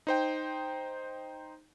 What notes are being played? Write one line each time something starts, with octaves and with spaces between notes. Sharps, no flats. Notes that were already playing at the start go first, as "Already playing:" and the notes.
D#4 C5 G5